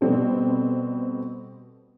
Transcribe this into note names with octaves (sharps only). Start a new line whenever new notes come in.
B2 G3 C4 A4